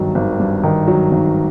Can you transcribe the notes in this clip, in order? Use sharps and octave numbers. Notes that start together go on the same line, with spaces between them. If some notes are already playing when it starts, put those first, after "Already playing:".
Already playing: G#1 G2 D#3 F#3
G#1
G2
D#3
F#3
G#1